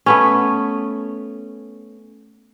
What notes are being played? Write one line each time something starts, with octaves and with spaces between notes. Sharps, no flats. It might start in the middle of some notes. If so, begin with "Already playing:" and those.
A3 B3 C#4